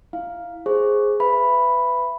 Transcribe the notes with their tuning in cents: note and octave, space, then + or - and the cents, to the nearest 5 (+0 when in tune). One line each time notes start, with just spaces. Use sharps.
E4 +0 F5 +0
G#4 +0 C5 +10 C#6 +0
B4 +20 E5 +25 B5 +0